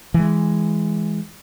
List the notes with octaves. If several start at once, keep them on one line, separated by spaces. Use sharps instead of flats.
E3 G#3